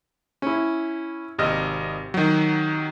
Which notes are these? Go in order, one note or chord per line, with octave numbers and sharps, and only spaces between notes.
C#4 E4
G#1 C3 D#5 F6
D#3 F#3